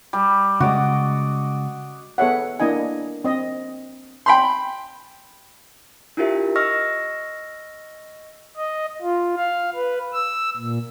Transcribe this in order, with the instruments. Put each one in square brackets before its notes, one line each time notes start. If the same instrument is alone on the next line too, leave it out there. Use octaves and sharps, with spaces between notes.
[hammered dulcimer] G3
[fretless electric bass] C#3 G#3 [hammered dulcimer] F#4 D5 D#5
[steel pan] B3 G#4 A4 C#5 E5 F#5
A#3 D4 E4 D#5 G#5
C4 D#5
[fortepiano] G5 B5 C6
[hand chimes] D4 E4 F4 G4 A#4 E5
D#5 C#6 E6 F6 A#6
[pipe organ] D#5
F4
F5
B4
E6
A#2